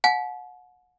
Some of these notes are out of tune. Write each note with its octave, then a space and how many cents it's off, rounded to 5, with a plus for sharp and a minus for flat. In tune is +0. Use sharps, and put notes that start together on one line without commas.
F#5 -30 A5 -45